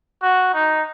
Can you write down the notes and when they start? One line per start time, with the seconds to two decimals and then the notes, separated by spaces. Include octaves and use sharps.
0.22 F#4
0.54 D#4